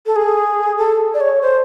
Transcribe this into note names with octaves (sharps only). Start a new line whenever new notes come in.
A4
G#4
A4
D5
C#5
C5